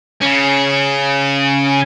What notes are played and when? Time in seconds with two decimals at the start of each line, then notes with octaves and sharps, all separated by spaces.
0.22 C#3 C#4